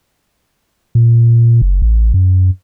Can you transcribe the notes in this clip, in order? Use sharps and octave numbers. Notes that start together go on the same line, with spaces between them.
A#2
F#1
A1
F#2